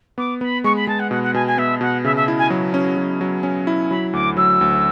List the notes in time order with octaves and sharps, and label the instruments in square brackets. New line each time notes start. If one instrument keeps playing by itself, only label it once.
[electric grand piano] B3 [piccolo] D6
[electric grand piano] B3 [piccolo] B5
[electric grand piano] G#3 [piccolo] C#6
[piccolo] B5
[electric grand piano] G#3 [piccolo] A5
[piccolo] F#5
[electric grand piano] B2 [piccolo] F#5
[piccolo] F#5
[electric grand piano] B2 [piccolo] G#5
[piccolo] G#5
[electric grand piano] B3 [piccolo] E5
[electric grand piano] B2 [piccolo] F#5
[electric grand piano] C#3 [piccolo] E5
[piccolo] E5
[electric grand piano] E4
[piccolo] G#5
[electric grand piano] F#3
C#4
F#3
F#3
C#4
E4
[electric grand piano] F#3 [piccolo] B5
[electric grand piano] D2 [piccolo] D6
[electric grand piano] F#3 [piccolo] E6
[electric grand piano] D2